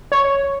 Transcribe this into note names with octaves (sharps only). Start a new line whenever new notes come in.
C#5